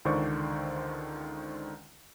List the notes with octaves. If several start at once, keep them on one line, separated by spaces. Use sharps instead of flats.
C#2 D3 D#3 C5 D5 C#6